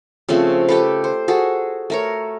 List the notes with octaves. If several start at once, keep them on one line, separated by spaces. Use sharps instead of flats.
C#3 F3 A3 C4
G4 A4 B4
C5
F#4 G#4 A4
A3 A#4 C#5